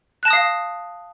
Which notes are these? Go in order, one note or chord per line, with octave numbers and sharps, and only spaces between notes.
F5 A5 D#6 F#6 A#6